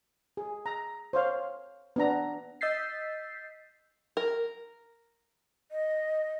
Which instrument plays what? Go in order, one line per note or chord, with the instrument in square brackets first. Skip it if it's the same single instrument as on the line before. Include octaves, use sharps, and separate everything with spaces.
[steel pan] G#4
A#5
C5 C#5 F5
B3 D4 A#5
[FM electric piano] D#5 E6 G6 A6 B6 C7
[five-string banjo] A#4
[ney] D#5